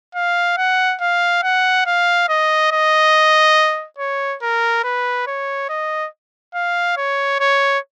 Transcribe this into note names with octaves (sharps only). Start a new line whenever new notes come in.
F5
F#5
F5
F#5
F5
D#5
D#5
C#5
A#4
B4
C#5
D#5
F5
C#5
C#5